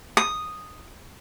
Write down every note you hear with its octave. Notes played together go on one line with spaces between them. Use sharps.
D#6